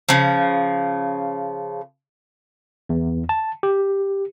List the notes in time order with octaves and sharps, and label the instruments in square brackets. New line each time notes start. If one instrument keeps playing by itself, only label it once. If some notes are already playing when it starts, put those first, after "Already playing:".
[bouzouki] C#3 F3
[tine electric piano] E2
A5
G4